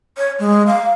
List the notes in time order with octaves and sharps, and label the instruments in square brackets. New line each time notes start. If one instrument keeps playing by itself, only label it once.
[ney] C#5
G#3
F5